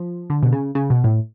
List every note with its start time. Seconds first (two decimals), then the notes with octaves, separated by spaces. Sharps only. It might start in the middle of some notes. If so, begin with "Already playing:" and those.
Already playing: F3
0.30 D3
0.43 B2
0.52 C#3
0.75 C#3
0.90 B2
1.04 A2